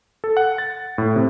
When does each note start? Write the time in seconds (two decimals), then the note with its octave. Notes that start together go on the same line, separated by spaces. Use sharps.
0.24 A4
0.37 F#5
0.58 A6
0.98 A2
1.16 C3